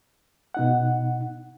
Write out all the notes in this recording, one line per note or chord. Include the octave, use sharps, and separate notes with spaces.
B2 D#4 F#5